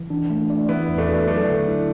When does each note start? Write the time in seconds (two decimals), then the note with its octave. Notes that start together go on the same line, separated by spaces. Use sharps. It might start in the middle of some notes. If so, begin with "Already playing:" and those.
Already playing: E3
0.10 D4
0.30 A3
0.50 D5
0.69 E3 B3 E4
0.88 E2
0.98 A3 D4
1.09 F#4
1.27 F#3 A3 D4
1.48 D3
1.68 E4